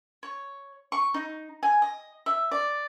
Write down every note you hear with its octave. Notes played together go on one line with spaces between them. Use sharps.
C#5
C#6
D#4
G#5
D#5
E5
D5